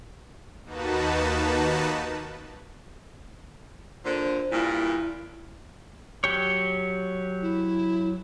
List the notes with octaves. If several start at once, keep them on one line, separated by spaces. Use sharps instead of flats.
D#2 A#3 D#4 F#4 B4 A5
A#2 D3 C5
G2 A#2 E4
F#3 G4 C#5
E4